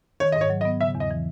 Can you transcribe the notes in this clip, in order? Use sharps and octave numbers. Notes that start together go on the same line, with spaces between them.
D#3 C#5
D#5
G#2
C#5
F#3
D#5
B3
C#3 E5
E2
D#5
E3